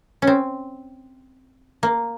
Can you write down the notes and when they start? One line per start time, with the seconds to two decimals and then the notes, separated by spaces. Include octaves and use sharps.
0.22 C#4
0.27 C4
1.83 A#3